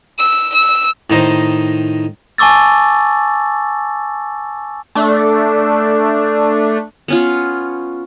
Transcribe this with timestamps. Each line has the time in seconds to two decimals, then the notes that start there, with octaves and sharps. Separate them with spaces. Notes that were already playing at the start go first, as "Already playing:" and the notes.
0.19 E6
0.54 E6
1.10 A2 D#3 D#4 C5
2.38 G#5 A5 C#6 D6 E6 A6
4.95 A3 D4
7.08 B3 C#4 F4